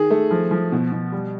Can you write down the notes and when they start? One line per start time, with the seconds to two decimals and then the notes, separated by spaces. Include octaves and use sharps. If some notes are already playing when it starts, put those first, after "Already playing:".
Already playing: D#3 G#4
0.10 A3
0.31 F3
0.51 F3
0.72 B2
0.92 B2
1.12 G3